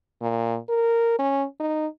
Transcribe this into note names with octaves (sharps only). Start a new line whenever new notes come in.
A#2
A#4
C#4
D#4